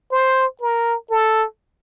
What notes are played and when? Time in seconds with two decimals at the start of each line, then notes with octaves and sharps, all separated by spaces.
0.11 C5
0.61 A#4
1.11 A4